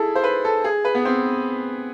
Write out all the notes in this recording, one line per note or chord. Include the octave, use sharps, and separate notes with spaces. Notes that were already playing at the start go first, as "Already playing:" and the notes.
Already playing: E4 G#4 A4
C5
B4
A4
G#4
B4
B3
C4